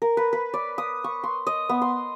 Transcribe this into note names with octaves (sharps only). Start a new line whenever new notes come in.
A#4
B4
B4
D5
D#6
C#6
C6
D#5
B3
C6